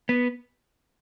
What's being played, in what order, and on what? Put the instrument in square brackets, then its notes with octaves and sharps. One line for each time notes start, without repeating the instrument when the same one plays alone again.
[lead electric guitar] B3